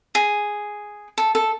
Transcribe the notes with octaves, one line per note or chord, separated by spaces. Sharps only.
G#4
A4
A4